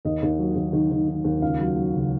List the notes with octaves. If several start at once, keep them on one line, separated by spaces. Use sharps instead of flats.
D#2 D#5
D#2
F#3
D#2
D#3
D#3
D#3
D#2
C#2 F5
F#3
F#3
C#2